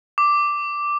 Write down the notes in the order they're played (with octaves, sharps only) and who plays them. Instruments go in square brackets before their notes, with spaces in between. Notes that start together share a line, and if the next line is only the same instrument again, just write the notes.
[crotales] D6